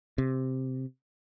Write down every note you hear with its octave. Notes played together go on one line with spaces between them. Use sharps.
C3